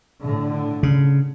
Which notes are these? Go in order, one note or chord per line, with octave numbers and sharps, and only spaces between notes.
A2 D3
C#3